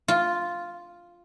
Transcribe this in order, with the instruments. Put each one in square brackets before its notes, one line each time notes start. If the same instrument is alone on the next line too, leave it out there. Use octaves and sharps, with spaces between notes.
[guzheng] F4